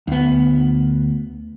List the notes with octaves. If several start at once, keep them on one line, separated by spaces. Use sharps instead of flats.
D2 B3